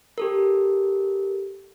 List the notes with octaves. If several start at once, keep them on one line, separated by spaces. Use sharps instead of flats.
G4 A4 A#4